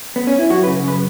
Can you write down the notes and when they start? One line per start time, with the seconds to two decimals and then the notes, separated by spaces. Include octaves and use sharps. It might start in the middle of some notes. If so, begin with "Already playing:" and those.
0.16 B3
0.27 C#4
0.39 E4
0.50 F#2 F#4
0.63 C#3 B4
0.84 F#2 B4